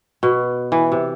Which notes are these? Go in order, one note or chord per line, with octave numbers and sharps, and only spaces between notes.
B2
E3
C3